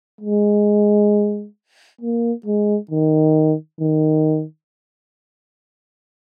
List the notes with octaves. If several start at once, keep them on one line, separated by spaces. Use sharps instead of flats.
G#3
A#3
G#3
D#3
D#3